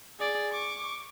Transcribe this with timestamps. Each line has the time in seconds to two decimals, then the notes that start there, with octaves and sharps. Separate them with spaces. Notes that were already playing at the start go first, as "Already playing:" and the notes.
0.19 G#4 D5
0.52 C#6 D6